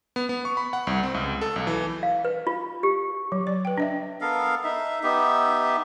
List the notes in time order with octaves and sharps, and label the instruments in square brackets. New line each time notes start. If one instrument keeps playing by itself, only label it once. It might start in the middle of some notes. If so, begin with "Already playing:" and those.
[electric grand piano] B3
B3
C#6
B5
F#5
C2
C4
C#2
A4
B1
E3
[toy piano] F5
B4
F4
G4
[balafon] F#3
D5
B4 G5
D4 D#5 E5
[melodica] B3 A4 A#4 F5
D#4 E5
B3 D#4 G4 E5